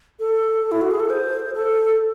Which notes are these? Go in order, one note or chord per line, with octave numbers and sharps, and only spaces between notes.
A4
E4
F#4
G#4
A4
C5
A4